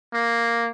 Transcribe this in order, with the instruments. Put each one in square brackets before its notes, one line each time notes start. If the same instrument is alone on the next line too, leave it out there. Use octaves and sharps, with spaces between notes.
[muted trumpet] A#3